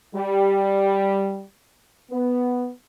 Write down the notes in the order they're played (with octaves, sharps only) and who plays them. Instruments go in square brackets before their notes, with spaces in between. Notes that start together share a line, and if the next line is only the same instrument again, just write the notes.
[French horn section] G3
B3